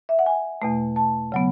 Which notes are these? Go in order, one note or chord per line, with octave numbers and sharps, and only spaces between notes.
E5
F#5
G#5
E2 B2 A3
A5
C#3 F#3 B3